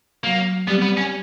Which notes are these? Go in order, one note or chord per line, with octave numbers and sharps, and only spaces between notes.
F#3 A#3
G3 B3
B3
C#4